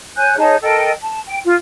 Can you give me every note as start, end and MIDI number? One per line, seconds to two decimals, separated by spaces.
0.17 0.36 73
0.17 0.36 80
0.17 0.36 90
0.17 0.36 91
0.37 0.55 63
0.37 0.55 68
0.37 0.55 73
0.37 0.55 81
0.62 0.91 69
0.62 0.91 70
0.62 0.91 75
0.62 0.91 79
1.03 1.19 81
1.26 1.39 79
1.44 1.56 65